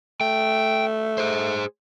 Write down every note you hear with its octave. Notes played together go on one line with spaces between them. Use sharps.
A3 G5
G#4 C5